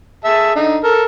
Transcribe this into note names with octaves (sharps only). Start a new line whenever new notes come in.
G#4 E5 A5
D3 D#4
A4 A#4